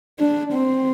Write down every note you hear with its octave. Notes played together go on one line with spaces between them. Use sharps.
D4
C4